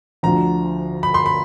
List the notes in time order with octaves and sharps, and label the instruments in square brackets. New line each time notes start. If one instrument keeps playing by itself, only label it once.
[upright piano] D2 D3 F3 [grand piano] A#5
[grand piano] B5
C6
B5